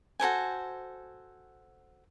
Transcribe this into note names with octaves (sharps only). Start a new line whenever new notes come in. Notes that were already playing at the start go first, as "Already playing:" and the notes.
F#4 A4 C5 G#5